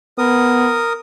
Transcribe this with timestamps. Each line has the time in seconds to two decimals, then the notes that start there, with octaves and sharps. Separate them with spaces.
0.18 B3 A#4 D#6